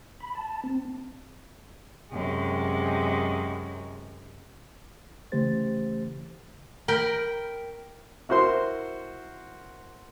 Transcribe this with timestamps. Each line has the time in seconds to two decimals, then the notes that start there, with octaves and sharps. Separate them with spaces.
0.20 B5
0.35 A5
0.64 C4
2.11 F#2 C3 G#3
5.32 C#3 E3 A3 G4 C5 A6
6.88 A#4 G5 B5
8.29 E4 F#4 A#4 C5 C6